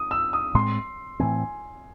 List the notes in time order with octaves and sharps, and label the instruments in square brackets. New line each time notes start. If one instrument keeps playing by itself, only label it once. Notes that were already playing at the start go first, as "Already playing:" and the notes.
Already playing: [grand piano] D#6
E6
D#6
[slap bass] A2 G#3 C4 [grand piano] C6
[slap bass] A2 E3 C4 [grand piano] G#5